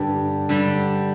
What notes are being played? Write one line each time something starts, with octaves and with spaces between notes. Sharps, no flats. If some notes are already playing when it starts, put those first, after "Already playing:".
Already playing: G2 D3 G3 D4
D3 G3 D4